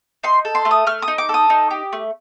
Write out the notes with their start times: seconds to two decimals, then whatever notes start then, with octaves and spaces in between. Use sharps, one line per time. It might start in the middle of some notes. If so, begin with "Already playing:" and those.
0.23 D#4 C6
0.45 A4
0.55 C6
0.65 A3
0.71 D#6
0.87 A3 F6
1.02 D#6
1.08 D#4
1.18 D6
1.29 A4
1.34 D#6
1.50 D#4
1.71 G4
1.93 A3